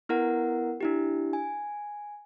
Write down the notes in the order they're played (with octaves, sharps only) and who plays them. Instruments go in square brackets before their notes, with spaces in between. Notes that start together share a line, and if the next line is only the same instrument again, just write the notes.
[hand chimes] B3 E4 A#4 F#5
D4 E4 G4
G#5